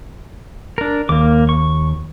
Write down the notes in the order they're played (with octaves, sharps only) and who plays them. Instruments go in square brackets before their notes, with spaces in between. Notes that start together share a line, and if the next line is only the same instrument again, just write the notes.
[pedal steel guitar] D4 A#4
[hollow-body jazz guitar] D#2 [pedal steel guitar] A#3 D6
[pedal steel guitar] C#6